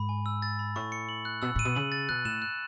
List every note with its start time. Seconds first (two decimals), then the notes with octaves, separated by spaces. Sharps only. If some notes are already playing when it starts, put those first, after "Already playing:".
Already playing: G#2 B5
0.09 G#5
0.26 E6
0.42 A6
0.59 B5
0.76 A2 C#6
0.92 C#7
1.09 F#7
1.25 F#6
1.42 B2 E6
1.56 A2 D#7
1.65 B2
1.75 C#3 F#7
1.92 A6
2.09 B2 F#6
2.25 A2 E7
2.42 F#6